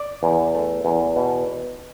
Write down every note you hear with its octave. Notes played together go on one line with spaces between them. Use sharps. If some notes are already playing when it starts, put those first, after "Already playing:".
Already playing: D5
E2
A3
E2
B2